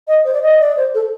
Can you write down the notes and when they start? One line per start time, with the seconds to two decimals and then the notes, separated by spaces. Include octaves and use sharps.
0.07 D#5
0.24 C5
0.33 D5
0.42 D#5
0.60 D5
0.77 C5
0.94 A4